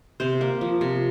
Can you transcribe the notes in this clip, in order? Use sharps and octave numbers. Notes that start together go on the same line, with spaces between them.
C3 C5
A#3
F3
C3